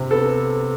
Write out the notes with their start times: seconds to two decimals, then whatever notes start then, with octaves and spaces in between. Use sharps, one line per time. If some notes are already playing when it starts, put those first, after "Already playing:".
Already playing: C3
0.11 B3 A4